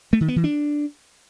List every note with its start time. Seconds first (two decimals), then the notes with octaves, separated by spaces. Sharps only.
0.13 A3
0.21 D#3
0.28 B3
0.36 E3
0.44 D4